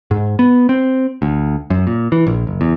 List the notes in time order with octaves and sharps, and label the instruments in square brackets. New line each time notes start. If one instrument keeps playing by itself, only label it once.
[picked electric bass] G#2
B3
C4
D2
F#2
A#2
E3
A#1
F#1
E2